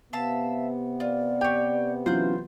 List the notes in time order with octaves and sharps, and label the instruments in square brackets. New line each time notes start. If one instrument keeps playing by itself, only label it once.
[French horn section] C3 B3 [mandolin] E5 F5 A5
[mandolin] F4 [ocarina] D5
[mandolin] G4 C#5 [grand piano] G5
[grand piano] E3 F#3 F4 [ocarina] C#4 [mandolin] C5 F#6